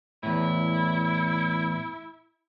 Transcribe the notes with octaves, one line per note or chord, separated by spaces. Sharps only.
E2 A2 E4